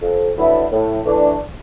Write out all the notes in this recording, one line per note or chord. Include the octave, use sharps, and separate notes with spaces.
F2
D3 F#3 B3 E4
A2
E3 A3 D4